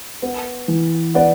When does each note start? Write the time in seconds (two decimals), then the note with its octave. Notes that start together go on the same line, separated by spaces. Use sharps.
0.22 B3
0.68 E3
1.14 B3 D5 F#5